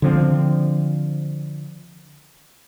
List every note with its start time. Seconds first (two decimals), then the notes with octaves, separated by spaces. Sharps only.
0.02 D3 F3 C4